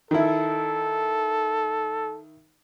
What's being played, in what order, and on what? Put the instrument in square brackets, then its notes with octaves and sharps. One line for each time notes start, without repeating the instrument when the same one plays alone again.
[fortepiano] D#3 E4 [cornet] A4